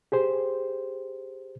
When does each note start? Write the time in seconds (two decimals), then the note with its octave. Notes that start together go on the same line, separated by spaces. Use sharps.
0.12 G4 G#4 C5